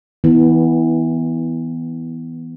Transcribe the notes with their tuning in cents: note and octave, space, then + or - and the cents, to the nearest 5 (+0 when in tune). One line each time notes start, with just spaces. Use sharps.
E3 -20 B3 +0